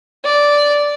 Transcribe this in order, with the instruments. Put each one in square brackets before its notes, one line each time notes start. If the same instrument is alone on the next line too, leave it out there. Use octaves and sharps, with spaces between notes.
[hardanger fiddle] D5